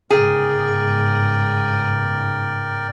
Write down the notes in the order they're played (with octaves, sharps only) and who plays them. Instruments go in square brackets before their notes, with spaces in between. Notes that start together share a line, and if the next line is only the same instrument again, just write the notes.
[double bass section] G1 G#2 C#3 [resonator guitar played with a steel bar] G#4 [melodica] A#4 D5 G5